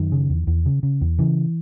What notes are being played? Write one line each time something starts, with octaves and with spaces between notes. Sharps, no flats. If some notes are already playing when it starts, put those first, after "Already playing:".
Already playing: F#2 D#3
C#3
E2
E2
C#3
C#3
E2
C#3 E3